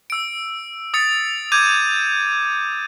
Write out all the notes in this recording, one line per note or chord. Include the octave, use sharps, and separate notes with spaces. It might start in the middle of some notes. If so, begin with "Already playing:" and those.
E6 D7
D#6 A6 C#7
D6 G6 G#6 D#7